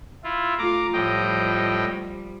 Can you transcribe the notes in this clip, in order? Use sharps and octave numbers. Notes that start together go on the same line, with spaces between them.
E4 F4
A3 F4 A#5 D6
A2 F3 G3 D#5 G5